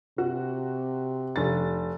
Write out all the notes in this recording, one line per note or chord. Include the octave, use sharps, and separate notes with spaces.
C3 F#4
F1 A6